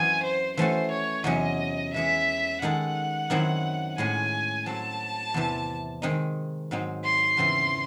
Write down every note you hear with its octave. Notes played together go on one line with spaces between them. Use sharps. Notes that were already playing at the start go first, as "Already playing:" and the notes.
Already playing: F#2 E3 C4 F#4 G#5
C5
E3 A3 C#4 F#4 A4 C5
C#5
E2 C3 F#3 C#4 G#4 D#5
E3 G#3 C#4 G#4 E5
D#3 G#3 D#4 A4 F#5
F#2 D#3 F#3 C4 E4
A2 G#3 C#4 G#5
F#3 C4 F#4 A4 A5
E2 C3 E3
D#3 G#3 C4 D#4
G#2 F#3 C4 D#4
C6
E2 C#3 E3 C4